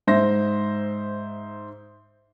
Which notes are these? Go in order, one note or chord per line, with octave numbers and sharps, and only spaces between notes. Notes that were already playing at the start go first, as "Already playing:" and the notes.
G#2 C5 E5 A#6